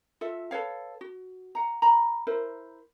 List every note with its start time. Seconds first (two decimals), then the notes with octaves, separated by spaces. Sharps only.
0.21 F4 A4 E5
0.51 A4 B4 C#5 F5
1.01 F#4
1.55 F#5 A#5
1.82 A#5 B5
2.27 E4 A#4 C5